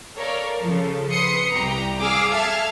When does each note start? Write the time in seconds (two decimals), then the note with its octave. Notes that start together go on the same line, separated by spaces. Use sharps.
0.16 A4 A#4 C#5 D5 F5
0.59 C#3 F3 A4
1.11 B4 C6 D#6 C7 C#7
1.52 C2 G4 A#5
2.00 G#4 F5 D6 E6 F6
2.32 A4 E5 F5 A5 F6 G#6